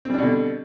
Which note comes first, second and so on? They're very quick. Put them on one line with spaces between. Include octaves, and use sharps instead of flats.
C4 G3 D4 B2 D3